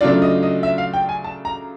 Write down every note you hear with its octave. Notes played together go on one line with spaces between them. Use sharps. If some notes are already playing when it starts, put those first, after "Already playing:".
C#3 F#3 A3 D4 F4 D5
D#5
D#5
E5
F5
G5
G#5
A5
A#5